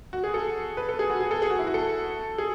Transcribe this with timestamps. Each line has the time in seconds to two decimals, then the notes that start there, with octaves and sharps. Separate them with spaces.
0.13 F#4
0.24 G#4
0.34 A4
0.77 B4
0.89 A4
0.99 G#4
1.10 F#4
1.21 G#4
1.31 A4
1.42 G#4
1.50 F#4
1.59 E4
1.67 F#4
1.74 A4
2.38 G#4